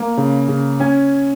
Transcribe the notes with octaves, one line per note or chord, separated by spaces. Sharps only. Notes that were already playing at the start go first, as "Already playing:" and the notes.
Already playing: A#3
C#3
C#3
C#4 G#5